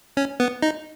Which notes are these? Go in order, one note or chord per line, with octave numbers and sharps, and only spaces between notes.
C#4
B3
D#4